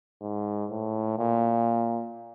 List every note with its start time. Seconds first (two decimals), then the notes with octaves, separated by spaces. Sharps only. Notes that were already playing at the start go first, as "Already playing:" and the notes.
0.22 G#2
0.70 A2
1.19 A#2